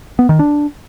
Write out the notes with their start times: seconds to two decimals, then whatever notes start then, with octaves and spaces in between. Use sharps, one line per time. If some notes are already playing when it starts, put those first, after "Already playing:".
0.19 B3
0.29 D#3
0.39 D4